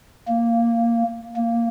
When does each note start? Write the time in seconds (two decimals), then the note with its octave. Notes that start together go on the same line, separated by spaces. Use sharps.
0.28 A#3
1.36 A#3